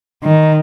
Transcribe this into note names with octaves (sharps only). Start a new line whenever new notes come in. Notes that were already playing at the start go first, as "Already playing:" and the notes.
D#3